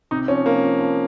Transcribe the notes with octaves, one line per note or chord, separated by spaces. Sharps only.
C3 D#4
F3 C#4
F3 A#3
F3
F3